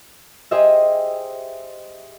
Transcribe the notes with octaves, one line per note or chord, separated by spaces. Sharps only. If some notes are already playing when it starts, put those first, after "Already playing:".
G4 G#4 C5 D#5 E5